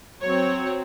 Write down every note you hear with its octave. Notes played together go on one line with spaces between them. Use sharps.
F#3 C4 C#5